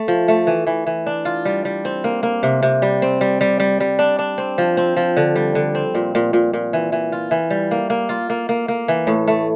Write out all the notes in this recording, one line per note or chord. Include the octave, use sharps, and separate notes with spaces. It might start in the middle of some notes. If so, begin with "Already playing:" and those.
Already playing: A3
F3
A3
E3
E3
E3
D4
F4
G3
G3
C4
A#3
A#3
C3
C3
G3
C4
G3
G3
G3
G3
D4
D4
C4
F3
C4
F3
D3
G3
D3
C4
A#2
A#2
A#2
A#2
E3
E3
F4
E3
G3
A#3
A#3
F4
A#3
A#3
A#3
E3
A2
A3